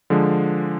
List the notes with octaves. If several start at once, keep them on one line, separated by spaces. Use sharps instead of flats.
D3 F3 G#3